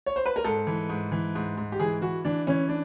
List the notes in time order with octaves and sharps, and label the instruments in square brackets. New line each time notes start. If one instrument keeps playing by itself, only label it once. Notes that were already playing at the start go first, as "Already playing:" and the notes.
[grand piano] C#5
C5
B4
A#4
G#2 A4
E3
G#2
E3
G#2
G#2
G4
E3 G#4
E3 F#4
E3 D4
E3 C#4
D4